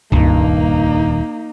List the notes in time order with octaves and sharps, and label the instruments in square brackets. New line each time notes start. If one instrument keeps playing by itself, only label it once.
[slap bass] D#1 [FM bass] C#2 [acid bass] G2 [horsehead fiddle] A#3 D#4